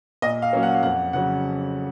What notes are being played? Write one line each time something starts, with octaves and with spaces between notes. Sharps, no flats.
A#2 D#5
F5
F#3 A#3 C#4
F#5
F5
F2 F#5
C#3 F#3 C#4 F#5